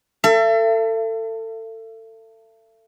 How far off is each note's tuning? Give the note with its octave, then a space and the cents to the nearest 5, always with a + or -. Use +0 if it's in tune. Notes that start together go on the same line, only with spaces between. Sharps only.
A4 +30 E5 +40